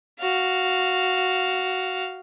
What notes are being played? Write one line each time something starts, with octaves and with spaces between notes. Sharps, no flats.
F#4 F5